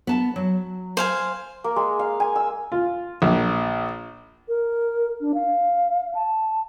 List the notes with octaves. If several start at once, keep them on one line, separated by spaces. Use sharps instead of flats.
B3 A5
F#3
C5 F5 G#5
A#3
G#3
F5
G#5
E6
F4
A#1
A#4
D4
F5
A5